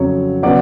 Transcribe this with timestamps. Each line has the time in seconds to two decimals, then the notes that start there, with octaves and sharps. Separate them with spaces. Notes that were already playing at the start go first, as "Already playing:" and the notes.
Already playing: F2 C#3 F#3 C#5
0.43 C#3 F#3 B3 D5